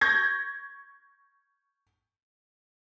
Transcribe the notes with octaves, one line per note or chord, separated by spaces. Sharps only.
C#6 G6 G#6 A#6